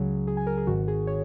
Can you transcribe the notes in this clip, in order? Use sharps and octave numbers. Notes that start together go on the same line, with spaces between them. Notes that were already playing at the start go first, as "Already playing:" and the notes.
Already playing: C#2 C#3 F#3 G#4
G#4
G#5
A#4
G#4
G#1 G#2 D#3 F#4
G#4
C#5